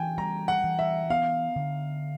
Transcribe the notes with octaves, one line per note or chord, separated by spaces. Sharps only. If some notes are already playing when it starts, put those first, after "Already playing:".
Already playing: E3 G5 G#5
G3 A#5
F#5
E3
E5
B3 F5
D3